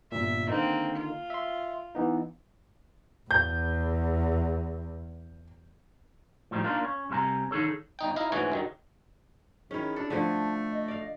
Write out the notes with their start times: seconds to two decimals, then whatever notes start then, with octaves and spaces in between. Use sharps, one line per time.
0.12 G1 A#2 E5
0.48 D3 D#3 A#3 C4 D#4
0.96 F4
1.30 E5 C6
1.95 E3 B3 D#4
3.31 E2 G6
6.51 A2 F3 G3 D#4
6.64 A#3 D4 D#4 F4
6.85 C#4
7.10 C2 C3 E4 G#5 A#5
7.51 D#3 D#4 G#4 A4 C#5
7.99 G1 D#4 G5
8.16 D#4 E4 D#5 F5
8.32 D2 G#2 E3 C#4 F#4 G#5
8.52 G2 D#3 F#3
9.71 D#3 C#4 E4 G#4
9.96 D4 A4
10.10 D3 F3 A3 D4 A5
10.72 D#5
10.88 D5 F5